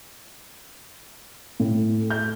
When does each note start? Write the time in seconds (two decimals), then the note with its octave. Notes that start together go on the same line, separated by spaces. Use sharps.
1.60 A2
2.10 G6